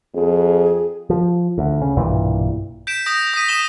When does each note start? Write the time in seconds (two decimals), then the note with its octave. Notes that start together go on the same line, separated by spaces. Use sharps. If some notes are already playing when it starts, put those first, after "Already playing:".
0.15 F2 G#4
1.10 F3
1.58 D2
1.82 C#3
1.97 B1 G2 A#2 E3
2.87 G6 B6 D7 E7
3.06 D#6 G6 A#6
3.34 D#6 A#6 B6 D#7
3.49 D#6 E7 G7